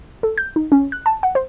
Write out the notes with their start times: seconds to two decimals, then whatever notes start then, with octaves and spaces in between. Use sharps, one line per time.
0.23 A4
0.38 G6
0.56 D#4
0.72 C#4
0.92 F#6
1.06 A5
1.23 F#5
1.35 C5